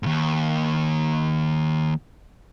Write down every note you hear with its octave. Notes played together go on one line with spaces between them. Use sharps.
D#2 G#2